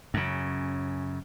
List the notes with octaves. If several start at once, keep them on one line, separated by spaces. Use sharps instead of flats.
F#2 C#3